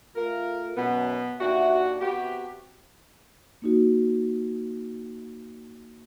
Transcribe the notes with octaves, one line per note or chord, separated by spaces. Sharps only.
A3 F4 A#4
F#2 B2 B3
D#2 D4 F#4 E5
C3 B3 F#4 G4
A#3 D#4 F#4